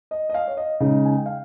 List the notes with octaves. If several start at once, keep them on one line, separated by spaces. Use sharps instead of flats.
D#5
D#5
F5
C#5
D#5
C#3 G#3 D#4 D#5
G#5
G5
F5